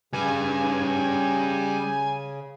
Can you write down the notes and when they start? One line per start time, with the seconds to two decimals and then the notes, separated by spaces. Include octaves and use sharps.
0.13 C#3 G3 B4 G#5